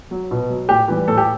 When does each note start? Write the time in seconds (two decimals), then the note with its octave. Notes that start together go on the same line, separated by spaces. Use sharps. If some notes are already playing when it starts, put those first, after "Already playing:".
0.11 F#3
0.31 B2
0.50 F#3
0.69 A2 G4
0.88 E3 G3
1.08 A2 A4
1.17 G4